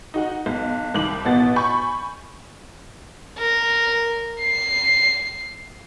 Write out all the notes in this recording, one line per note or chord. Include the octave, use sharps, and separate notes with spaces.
D#4 F#4 F#5
B1
C2 D#3 G3 G4 F#7
A1 B2 B3 F#4 A6
G#5 B5 C#6 G6
A#4
C7